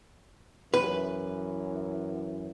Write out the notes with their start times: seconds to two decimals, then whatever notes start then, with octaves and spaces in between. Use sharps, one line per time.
0.74 F#2 E3 B4